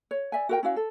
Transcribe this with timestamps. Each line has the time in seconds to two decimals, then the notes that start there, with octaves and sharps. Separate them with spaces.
0.11 C#5
0.32 D5 E5 G#5
0.49 F#4 A#4 G5
0.63 C#4 E4 F#4 F5
0.76 A4